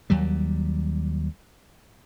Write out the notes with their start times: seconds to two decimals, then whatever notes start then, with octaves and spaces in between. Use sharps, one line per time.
0.10 D#2 F#3 G3